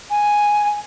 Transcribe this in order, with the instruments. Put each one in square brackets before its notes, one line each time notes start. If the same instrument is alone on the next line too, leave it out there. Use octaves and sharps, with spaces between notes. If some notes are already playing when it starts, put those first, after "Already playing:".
[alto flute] G#5